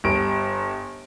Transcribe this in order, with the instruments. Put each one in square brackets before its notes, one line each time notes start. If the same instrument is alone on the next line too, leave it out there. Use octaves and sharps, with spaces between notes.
[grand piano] G1 G3 D7